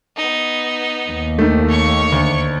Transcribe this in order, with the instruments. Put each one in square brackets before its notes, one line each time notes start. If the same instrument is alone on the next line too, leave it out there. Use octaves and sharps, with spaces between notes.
[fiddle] B3 D#4
[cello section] D#2
[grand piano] D#3 A3
[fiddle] C#5 C#6
[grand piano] D2